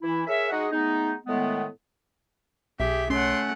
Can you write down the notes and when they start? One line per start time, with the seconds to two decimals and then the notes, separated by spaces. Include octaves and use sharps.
0.02 E3 E4
0.27 G#4 A#4 C#5 E5
0.50 G#3 D#4 F#4 G#4 D#5 F#5
0.71 G#3 A3 B3 D#4
1.27 A2 D#3 G#3 A3 B3
2.80 B1 G4 G#4 E5
3.10 A3 C#4 F#5 C6